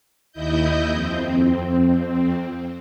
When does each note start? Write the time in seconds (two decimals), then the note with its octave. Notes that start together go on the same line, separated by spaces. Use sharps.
0.32 D#2 E4 D#5 G6
0.89 F2 C4